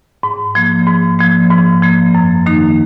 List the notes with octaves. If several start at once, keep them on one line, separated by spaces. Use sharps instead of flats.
G#2
F3 A#3
G#2
F3 A#3
G#2
F3 A#3
F#2
D#3 A#3 D#4